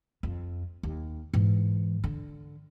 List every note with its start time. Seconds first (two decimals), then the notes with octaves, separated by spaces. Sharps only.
0.23 F2
0.83 D#2
1.34 G#2 E3
2.04 D3